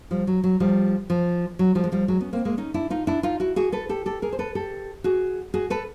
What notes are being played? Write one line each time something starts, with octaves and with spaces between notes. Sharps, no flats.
F3 G3
F#3
F#3
F3 G3
F3
F#3
F3 G3
G#3
F3 G3
F#3 G#3
B3 C#4
A#3 C4
G#3 A#3
C#4 D#4
D4 E4
D#4 F4
D4 E4
D#4 F4
E4 F#4
F#4 G#4
A4 B4
G4 A4
G4 A4
G#4 A#4
C5
A4 B4
G4 A4
F#4 G#4
F#4 G#4
A4 B4